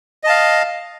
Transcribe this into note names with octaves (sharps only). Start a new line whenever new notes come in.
D#5 F5 A5